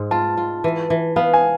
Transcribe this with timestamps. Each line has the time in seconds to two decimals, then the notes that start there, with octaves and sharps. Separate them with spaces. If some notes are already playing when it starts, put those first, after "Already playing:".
Already playing: G#2 G#3
0.11 F4 A5
0.37 F4
0.64 E3
0.90 E3
1.16 B3 F5
1.34 G#5